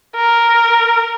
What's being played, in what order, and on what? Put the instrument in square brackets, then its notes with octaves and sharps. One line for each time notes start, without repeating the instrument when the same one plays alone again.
[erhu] A#4